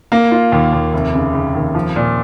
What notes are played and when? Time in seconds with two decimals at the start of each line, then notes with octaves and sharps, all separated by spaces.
0.12 A#3
0.32 F4
0.52 D#2
0.73 D#2
0.93 F1
1.14 C#3
1.34 C#3
1.55 D#2
1.75 F3
1.96 A#2